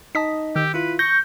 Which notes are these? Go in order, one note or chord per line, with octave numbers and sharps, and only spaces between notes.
D#4 D#5 A5 D#6 B6
D#3 G4 E6
E4 F4 B4
C#6 G6 A#6